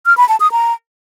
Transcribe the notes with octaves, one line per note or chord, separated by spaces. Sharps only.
F6
B5
A5
D#6
A#5